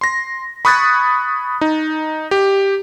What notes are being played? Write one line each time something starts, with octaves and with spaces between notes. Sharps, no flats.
C6 A#6
B5 C#6 D#6 F#6 G#6 A6
D#4
G4